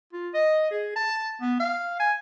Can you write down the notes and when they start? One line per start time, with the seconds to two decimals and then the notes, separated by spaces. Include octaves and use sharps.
0.13 F4
0.34 D#5
0.71 G#4
0.96 A5
1.41 B3
1.60 F5
2.00 G#5